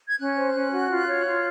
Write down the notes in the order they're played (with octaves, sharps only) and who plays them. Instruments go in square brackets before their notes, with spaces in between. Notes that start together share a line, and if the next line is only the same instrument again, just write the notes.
[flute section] G#6
C#4 F#6
C5
C#4
F#4
F4
C#5
F4